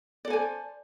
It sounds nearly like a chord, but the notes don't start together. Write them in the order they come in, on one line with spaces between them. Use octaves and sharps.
D5 A4 G#5 C5